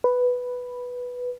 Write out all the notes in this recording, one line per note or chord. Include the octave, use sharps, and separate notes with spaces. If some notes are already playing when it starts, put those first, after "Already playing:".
B4